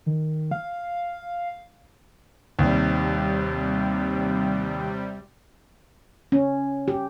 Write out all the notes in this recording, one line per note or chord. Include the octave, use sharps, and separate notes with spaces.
D#3
F5
D#2 C3 G3
C#4
G4